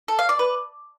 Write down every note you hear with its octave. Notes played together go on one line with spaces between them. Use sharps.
A4
F5
D5
B4